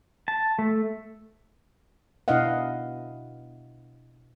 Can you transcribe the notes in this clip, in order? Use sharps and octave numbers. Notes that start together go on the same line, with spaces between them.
A5
A3
B2 D4 E4 D#5 F5 F#5